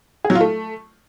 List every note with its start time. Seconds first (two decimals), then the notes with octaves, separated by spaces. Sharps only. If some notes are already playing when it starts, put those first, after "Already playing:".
0.24 G#4
0.30 F#3
0.35 F4
0.41 A3